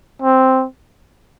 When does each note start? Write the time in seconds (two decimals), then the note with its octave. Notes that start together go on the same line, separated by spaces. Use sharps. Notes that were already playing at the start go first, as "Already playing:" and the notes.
0.22 C4